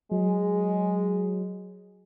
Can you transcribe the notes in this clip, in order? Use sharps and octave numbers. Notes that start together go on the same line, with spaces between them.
F#3 G#3